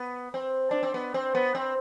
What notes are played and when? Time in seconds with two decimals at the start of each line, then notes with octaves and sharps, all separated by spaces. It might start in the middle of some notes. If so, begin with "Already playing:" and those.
Already playing: B3
0.34 C4
0.71 D4
0.83 C4
0.94 B3
1.14 C4
1.35 B3
1.55 C4